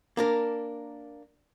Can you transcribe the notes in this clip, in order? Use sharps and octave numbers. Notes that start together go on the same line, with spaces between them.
A#3 D4 A#4